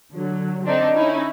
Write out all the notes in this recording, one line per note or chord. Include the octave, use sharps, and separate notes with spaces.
D3 F#3
D3 C4 D4 D#4
C#4 D#4 E4